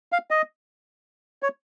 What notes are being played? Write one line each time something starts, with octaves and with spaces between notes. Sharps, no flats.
F5
D#5
C#5